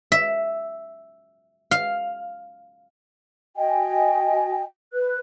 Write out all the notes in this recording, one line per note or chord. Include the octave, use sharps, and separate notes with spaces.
E5
F5
F#4 D#5 G5 G#5
B4 F#6